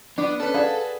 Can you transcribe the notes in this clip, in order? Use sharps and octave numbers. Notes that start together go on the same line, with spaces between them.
B3 D4
C#4 A4 B4
G#4 B4 D5 F5 F#5